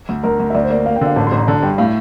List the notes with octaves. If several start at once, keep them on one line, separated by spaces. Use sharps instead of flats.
D2
D2 A#4
D2
E5
D2 D5
C5
A#3 D5
A#3 F5
G5
D3 F5
A1 A5
C6
A1
A#5
D3 A5
G2 G5
A2 F5